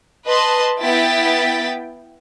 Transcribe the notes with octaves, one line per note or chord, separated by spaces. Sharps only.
B4 D#5 A5 C6
B3 E4 G5 A6 B6